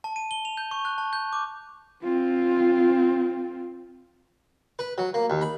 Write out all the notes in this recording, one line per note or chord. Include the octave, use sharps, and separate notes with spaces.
A5
D#7
G7
F7
G6
C#6
F#6
A5
G6
D6
C4 F4
B4
F#3
A#3
D#2
B5